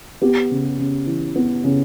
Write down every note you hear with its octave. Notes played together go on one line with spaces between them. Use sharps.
B3 G4
C#3
C#3
E3
B3
C#3